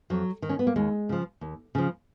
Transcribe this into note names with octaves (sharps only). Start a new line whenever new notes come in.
F2 F#3
D#3
C#4
B3
A#3
D#2 G#3
C#3 F3
D#2
C#3 F3